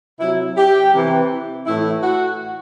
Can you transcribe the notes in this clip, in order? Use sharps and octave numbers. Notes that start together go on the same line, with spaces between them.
C3 F#3 E4
G4
C3 E3
A2 E3 E4
F#4